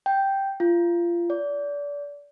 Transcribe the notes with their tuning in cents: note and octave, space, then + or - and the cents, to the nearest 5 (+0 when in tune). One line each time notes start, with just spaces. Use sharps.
G5 -5
F4 -25
D5 -30